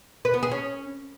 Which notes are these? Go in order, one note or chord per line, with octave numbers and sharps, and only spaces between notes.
B4
B3
G#4
C#4